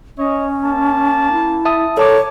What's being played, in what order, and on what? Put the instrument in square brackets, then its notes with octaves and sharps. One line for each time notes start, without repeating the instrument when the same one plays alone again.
[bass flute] C#4 [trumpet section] C#5 D#5
[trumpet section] A#3 A5
[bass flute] E4
[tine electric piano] E5 A5 D#6
[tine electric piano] A4 A5 D6 [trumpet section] A#4 D5 [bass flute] C#5